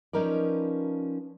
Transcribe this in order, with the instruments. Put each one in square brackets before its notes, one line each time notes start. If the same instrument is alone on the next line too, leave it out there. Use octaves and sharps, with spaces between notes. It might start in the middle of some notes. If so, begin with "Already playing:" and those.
[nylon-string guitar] F3 C#4 D#4 A#4 B4 D5